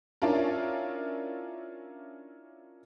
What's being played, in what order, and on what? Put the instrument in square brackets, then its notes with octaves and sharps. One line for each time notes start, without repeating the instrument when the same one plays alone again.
[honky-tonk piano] C#4 D4 E4 F4 A#4